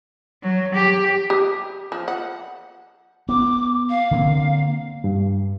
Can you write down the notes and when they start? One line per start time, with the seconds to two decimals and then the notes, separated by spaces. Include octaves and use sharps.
0.43 F#3
0.74 G4
1.30 G4
1.92 F3
2.08 F#5
3.29 B3 D6
3.90 F5
4.11 D3 A#3 C4
5.04 G2